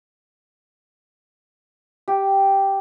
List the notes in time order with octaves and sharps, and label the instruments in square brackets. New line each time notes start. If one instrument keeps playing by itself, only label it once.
[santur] G4